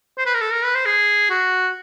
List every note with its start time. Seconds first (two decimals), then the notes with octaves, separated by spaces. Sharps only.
0.18 C5
0.26 B4
0.34 A#4
0.41 A4
0.52 A#4
0.64 B4
0.75 C5
0.86 G#4
1.30 F#4